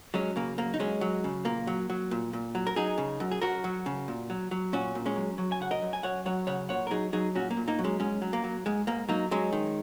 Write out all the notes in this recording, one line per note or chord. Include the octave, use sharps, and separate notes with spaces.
F#3 G#3 C#4
C#3 A#3
F#2 A#3
D#4
F#2 G#3 C#4
F#3
C#3
A#2 A#3
F#3
F#3
A#2
A#2
F#3
A#4
F#3 D#4 G#4
C#3
F#2
G#4
F#2 F#4 A#4
F#3
C#3
A#2
F#3
F#3
A#2 C#4 F#4
A#2
G#3 C#4
F#3
F#3
G#5
C#3 F#5
A#4 D#5
F#2
G#5
F#2 C#5 F#5
F#3 C#5 F#5
C#3 C#5 F#5
A#2 C#5 F#5
A#4
F#3 D#4 G#4
F#3 D#4 G#4
A#2 C#4 F#4
A#3
A#2
A#3 D#4
F#3
G#3 C#4
G#2 G#3 C#4
F#3
A#3
F#3
G#2 G#3
G#2 A#3
F#3 A#3 D#4
F#3 G#3 C#4
D#3